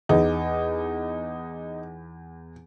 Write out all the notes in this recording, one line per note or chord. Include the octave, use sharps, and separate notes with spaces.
E2 D#4